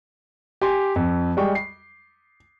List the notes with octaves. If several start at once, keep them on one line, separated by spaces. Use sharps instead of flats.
G4 G#5 C6
F2
G3 G#3 G5 C#6
C7